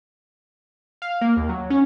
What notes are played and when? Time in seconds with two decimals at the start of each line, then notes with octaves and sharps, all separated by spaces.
1.02 F5
1.21 A#3
1.37 D#2
1.49 F#3
1.70 C#4